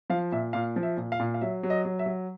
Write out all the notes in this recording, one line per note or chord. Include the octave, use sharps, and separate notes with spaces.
F3 F5
A#2 E5
A#2 F5
F3
E5
A#2
F5
A#2
F5
F#3 E5
F#3
D#5
F#3
E5
F#3